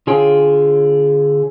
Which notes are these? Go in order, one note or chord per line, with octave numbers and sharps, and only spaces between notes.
D3 F4 G#4 C#5 G5